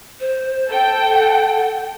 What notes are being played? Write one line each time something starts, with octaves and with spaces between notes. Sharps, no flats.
C5
A4 G5
F#5